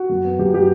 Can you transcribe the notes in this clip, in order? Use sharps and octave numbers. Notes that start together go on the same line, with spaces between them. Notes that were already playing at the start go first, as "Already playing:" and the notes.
Already playing: F#4
F#2
B3
F#2 G4
F#3 G4